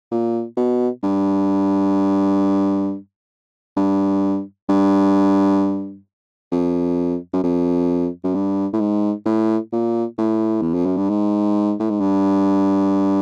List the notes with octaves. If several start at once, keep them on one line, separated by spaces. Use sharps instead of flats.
A#2
B2
G2
G2
G2
F2
F#2
F2
F#2
G2
A2
G#2
A2
A#2
A2
E2
F2
F#2
G2
G#2
A2
G#2
G2